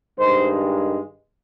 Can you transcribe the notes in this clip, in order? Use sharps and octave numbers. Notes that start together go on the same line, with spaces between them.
G2 D#3 G#3 C5